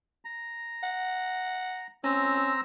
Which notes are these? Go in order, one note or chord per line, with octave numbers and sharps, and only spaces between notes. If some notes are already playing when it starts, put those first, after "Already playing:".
A#5
F#5
C4 C#4 A#5 E6